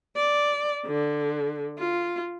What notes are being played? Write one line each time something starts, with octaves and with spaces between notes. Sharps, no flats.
D5
D3
F4